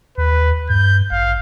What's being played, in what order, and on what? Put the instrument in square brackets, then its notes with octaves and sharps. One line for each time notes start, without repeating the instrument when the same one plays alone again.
[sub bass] D#2 [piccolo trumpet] B4
[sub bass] G2 [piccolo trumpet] G6
[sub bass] A1 [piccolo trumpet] F5